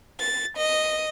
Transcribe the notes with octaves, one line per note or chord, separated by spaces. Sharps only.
A6
D#5